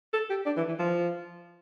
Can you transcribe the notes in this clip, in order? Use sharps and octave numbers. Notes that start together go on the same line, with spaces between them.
A4
G4
D4
E3
E3
F3